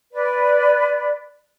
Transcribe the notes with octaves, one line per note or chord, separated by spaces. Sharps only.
B4 D5